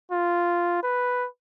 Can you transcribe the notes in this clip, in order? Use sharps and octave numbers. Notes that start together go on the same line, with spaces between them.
F4
B4